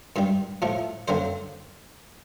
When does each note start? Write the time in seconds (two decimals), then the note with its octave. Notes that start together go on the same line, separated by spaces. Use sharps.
0.16 G2 D#3 G3
0.62 A2 F3 A3
1.08 F#2 D3 F#3 A#3 C5